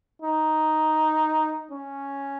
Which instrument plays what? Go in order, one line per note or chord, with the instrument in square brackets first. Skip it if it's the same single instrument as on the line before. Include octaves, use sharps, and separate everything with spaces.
[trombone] D#4
C#4